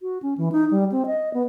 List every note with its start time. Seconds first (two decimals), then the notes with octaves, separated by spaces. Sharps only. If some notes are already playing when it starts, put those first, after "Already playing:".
0.01 F#4
0.22 C#4
0.38 E3
0.52 D#4
0.71 G3
0.92 C4
1.06 D#5
1.34 B3